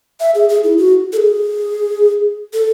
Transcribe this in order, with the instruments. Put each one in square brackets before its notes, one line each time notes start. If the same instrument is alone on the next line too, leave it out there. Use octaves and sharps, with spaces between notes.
[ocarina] E5
G#4
G#4
E4
F#4
A4
G#4
A4